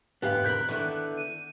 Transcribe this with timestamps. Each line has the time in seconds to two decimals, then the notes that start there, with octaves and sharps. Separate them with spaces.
0.22 E2 G#2 D3 B3 G4 F5 F#6
0.44 C3 A#4 B5 G6 B6
0.69 C2 D3 D#3 B3 E4
1.17 D#7